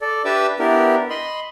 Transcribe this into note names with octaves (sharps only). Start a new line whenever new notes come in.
A4 D5
D4 G4 B4 E5 D6 E6
B3 D4 E4 G4 A#4
D#5 B5 C6